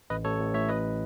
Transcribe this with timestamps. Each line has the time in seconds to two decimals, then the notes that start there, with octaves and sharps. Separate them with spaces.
0.10 A1 B4 D#5
0.25 A1 A4 C#5
0.40 A1
0.54 A2 C#5 E5
0.69 A1 B4 D#5